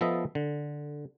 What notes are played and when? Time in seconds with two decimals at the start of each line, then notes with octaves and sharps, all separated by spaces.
0.01 F3 B3 A4 D#5 E5
0.35 D3